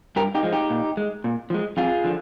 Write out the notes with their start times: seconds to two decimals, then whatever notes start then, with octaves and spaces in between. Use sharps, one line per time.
0.16 G2 G4 A#4
0.35 D#4 G4
0.43 F3 G#3
0.52 D#4 G4
0.70 A#2
0.97 G#3
1.24 A#2
1.50 F3 G#3
1.77 F2 F4 G#4
2.04 D3 F3